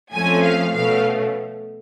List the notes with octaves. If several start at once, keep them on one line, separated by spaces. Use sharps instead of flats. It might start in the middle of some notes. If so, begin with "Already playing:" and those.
F2 F3 A3 C#4 G#5
F5
B2 A3 C#4 F5